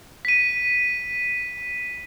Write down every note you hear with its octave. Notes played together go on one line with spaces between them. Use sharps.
B6 D#7